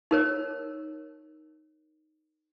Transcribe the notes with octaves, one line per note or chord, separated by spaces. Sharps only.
D#4 A#4 C#5